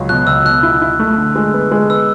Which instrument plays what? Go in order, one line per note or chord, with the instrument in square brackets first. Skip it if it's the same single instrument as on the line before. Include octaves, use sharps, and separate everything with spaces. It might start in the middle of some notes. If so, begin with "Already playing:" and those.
Already playing: [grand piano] C#2 F#3
[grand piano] B2 [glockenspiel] F#6
[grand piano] C#2 [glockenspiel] E6
[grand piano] B2 [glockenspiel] F#6
[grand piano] E4
E4
A3
D3
G#3
B3
G#3
[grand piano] B3 [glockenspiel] E6